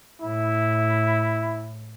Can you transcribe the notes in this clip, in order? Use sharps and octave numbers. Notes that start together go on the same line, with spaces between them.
A2 E4